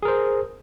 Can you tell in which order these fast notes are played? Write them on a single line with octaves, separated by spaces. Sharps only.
G#4 A#4 C5